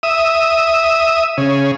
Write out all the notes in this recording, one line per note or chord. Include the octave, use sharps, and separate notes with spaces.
E5 D#6
C#3